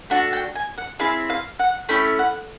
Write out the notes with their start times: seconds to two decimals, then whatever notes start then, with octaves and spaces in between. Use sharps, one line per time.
0.10 A3 D4 F#4 F#5
0.33 G5
0.56 G#5
0.78 F#5
0.99 C4 E4 G#4 F5
1.30 F5
1.59 F#5
1.89 A3 C#4 E4 G5
2.19 F#5